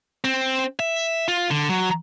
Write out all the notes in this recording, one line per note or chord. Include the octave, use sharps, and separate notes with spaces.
C4
E5
F4
D3
F#3